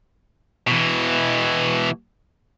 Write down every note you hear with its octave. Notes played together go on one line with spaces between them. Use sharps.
B2 E3